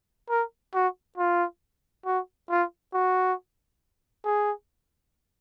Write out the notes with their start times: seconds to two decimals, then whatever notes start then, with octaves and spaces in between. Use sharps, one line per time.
0.29 A#4
0.74 F#4
1.18 F4
2.06 F#4
2.50 F4
2.93 F#4
4.25 G#4